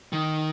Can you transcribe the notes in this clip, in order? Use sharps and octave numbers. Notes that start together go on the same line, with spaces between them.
D#3